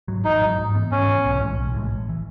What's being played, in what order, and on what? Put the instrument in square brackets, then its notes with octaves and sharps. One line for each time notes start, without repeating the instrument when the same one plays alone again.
[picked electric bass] G#2 F#3
[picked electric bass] A1 [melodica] D#4
[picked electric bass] G#2 F#3
G#2
E3 B3
[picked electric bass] G#2 [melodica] C#4
[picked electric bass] E3 B3
B1
A2 E3 G#3
B1
A2 E3 G#3
A1
E3